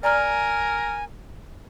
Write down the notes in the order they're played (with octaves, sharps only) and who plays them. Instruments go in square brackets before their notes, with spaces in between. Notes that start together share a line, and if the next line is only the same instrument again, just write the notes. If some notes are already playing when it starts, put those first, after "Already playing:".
[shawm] A#4 [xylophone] D5 A#5 F6 [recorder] G#5